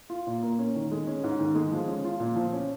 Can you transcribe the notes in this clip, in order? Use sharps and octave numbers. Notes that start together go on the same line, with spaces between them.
F4
A#2
A#3
C#4
D#3
G#3
C#4
G#2
D#3
G#3
F3
C#4
F4
A#2
F3
C#4